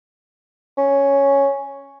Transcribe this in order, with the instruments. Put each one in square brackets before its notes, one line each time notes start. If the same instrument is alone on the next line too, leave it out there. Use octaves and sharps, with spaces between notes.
[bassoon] C#4